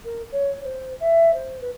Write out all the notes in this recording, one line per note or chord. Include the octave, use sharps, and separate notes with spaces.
A#4
C#5
C5
E5
C5
B4